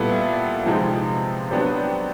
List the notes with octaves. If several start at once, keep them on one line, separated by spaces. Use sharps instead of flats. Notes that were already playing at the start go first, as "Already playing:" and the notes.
Already playing: A#2 G3 B3 E4 A4
C3 F3 G#3 C4 D#4
F#3 B3 D4 G4 C5